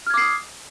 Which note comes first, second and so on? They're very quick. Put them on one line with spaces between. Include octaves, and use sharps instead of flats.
F6 G#6 D6 C7 D#6